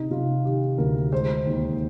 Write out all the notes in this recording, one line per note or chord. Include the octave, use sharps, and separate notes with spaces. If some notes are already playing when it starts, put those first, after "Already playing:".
Already playing: C3 D#4
C3 F4
D#3 G4
D2 A#4
G#3 C5
D#2